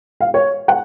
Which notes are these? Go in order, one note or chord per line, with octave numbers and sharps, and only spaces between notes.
F5
C#5
F#5